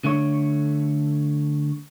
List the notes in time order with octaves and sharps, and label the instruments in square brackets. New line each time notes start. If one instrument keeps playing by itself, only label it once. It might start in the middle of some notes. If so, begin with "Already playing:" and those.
[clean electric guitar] D3 A3 C#5